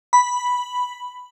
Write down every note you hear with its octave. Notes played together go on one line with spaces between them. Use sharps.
B5